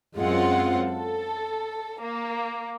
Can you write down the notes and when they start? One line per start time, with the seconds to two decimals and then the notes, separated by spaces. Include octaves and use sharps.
0.17 F#2 G#3 C4 F4 F#5
0.89 A4
2.01 A#3